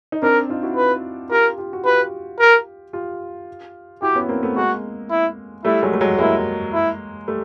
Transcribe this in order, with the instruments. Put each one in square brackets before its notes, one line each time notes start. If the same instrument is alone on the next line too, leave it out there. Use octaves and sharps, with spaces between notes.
[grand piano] D#4
[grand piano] C4 D4 [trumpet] A#4
[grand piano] D#4 F4
E4 F#4
[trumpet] B4
[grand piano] F4 G4 [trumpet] A#4
[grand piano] F4 G4
F#4
[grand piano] F4 G4 [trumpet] B4
[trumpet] A#4
[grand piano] F4 G4
[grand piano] E4 F#4 [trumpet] G4
[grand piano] B3 C#4
A#3 C4
A3 B3
[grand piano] G#3 A#3 [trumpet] F#4
[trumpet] E4
[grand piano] G3 A3 [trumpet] E4
[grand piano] F#3 G#3
A3
F#3 G#3
[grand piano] G#3 A#3 [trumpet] E4
[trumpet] E4
[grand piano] G3 A3